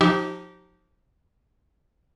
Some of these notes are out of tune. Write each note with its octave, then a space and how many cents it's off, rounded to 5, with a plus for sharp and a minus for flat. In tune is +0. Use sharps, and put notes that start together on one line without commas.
F3 +25 D#4 +0 G4 -25